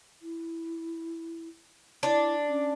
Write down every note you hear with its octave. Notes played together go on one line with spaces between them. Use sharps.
E4
D4 E4
C#4